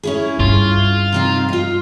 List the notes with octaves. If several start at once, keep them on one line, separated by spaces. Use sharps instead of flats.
C#4 E4 G#4
G2 F4
C3 C4 D#4
F4 D#5